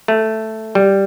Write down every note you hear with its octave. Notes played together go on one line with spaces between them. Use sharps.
A3
G3